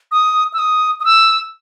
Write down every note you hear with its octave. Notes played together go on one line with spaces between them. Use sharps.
D#6
E6
D#6
D#6
E6